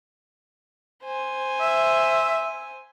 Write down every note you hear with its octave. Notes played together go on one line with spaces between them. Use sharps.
C5 G#5
E5